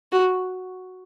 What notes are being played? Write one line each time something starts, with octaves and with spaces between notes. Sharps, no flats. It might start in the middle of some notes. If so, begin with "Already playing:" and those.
F#4